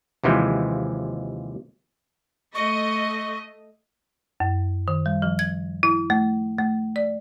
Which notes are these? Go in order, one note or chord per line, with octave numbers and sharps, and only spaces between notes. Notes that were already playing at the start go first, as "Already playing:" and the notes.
D#2 C3 E3 F3 G#3
A3 D#5 C#6
F#2
D#3
G3
F3
G#6
E4
A3
A3
D5